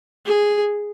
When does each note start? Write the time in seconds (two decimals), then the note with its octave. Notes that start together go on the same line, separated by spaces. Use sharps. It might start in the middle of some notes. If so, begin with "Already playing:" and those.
0.26 G#4